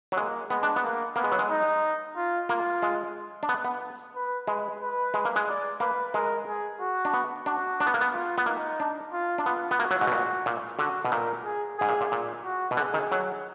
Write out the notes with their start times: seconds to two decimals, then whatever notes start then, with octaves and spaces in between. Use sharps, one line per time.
0.12 F#3
0.17 G#3 A#3
0.49 G#3 B3
0.63 D4
0.76 B3
0.83 A#3
1.16 A#3 B3
1.24 G#3
1.32 F#3
1.39 G#3
1.49 D#4
2.16 F4
2.49 A#3 F4
2.83 G#3
3.43 D4
3.49 B3
3.65 B3
4.15 B4
4.47 G#3 B4
4.81 B4
5.14 G#3
5.25 A#3
5.36 G#3
5.47 D5
5.80 A#3 B4
6.14 G#3 A#4
6.48 G#4
6.81 F#4
7.05 D4
7.14 B3
7.46 D4 F#4
7.80 D4
7.87 B3
7.94 A#3
8.01 B3
8.14 F4
8.38 B3
8.46 A#3 D#4
8.80 D4
9.13 F4
9.38 D4
9.45 B3 F4
9.71 B3
9.79 A#3 F#4
9.91 F#3
10.01 G#2
10.07 B2
10.12 A#2
10.46 A#2
10.78 D3 F#4
11.05 B2
11.11 A#2 A#4
11.44 G#4
11.78 G#2 G#4
11.89 A#2
12.01 A#2
12.12 A#2
12.45 F#4
12.71 B2
12.77 D3 G#4
12.94 D#3
13.12 F#3